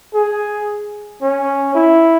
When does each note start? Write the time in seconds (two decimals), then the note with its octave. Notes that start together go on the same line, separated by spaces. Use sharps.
0.14 G#4
1.22 C#4
1.75 E4